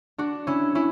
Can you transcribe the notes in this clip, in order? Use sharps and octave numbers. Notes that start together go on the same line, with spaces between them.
D4 F#4
C#4 E4
C#4 E4